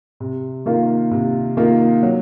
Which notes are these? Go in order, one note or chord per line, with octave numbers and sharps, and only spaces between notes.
C3
D#3 A#3 F4 A#4
C3
D#3 A#3 F4 A#4
F#3